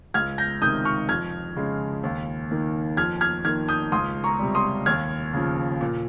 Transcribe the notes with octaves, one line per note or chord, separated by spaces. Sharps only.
C#2 F6 G#6
G6 A#6
C3 D#3 D#6 G6
C#6 F6
F2 F6 G#6
C#3 G#3
D#2
D#3 A#3
F2 F6 G#6
F6 G#6
D#3 A#3 F6 G#6
D#6 G6
C#2 C6 D#6
A#5 C#6
C3 G3
C6 D#6
D#2 F6 G#6
C#3 F3
A#2